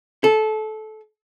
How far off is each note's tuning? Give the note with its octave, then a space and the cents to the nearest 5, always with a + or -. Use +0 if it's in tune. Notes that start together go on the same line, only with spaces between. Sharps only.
A4 -20